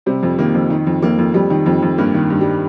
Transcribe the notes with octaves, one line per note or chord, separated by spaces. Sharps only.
C3 G3 C4
F2
D#3 A#3
F2
D#3
F2
F2 A#3
F2
F2 G3
D#3
F2
F2
G2 A#3
D#3
G2
G3